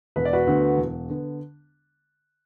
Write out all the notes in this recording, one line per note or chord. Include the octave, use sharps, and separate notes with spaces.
E1 B4
D5
F#4 B4
D2 D3 B3
E1
D3 B3